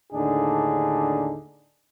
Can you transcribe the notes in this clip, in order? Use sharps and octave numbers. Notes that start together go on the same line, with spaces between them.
D#2 A2 D3 D4 D#4 G#4